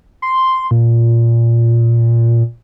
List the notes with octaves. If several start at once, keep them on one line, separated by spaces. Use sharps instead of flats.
C6
A#2